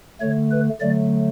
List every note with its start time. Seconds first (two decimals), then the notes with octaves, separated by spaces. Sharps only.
0.21 D3 A3 C#5
0.51 B4
0.81 D3 F#3 A3 D5